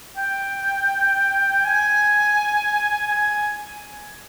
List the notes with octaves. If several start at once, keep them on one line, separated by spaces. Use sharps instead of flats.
G5
G#5
G#5